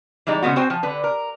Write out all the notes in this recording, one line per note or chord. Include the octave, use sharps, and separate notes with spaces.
E3 G3 G#3 D#4
C#3 G#3 B3 F#4
C4 F#4 C5 G5 G#5
F3
D3 B4
A#4